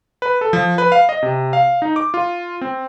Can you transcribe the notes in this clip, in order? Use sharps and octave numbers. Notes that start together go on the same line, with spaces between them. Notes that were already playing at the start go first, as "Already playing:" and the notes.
B4
A4
F3
B4
F5
D#5
C3
F5
D#4
D6
F4
C4